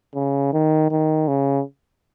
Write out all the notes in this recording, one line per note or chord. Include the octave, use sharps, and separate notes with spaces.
C#3
D#3
D#3
C#3